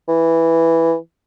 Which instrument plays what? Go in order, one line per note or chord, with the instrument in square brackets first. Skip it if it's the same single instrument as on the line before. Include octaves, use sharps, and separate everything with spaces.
[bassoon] E3